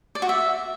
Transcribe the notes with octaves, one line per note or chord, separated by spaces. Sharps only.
D5
F#4
E5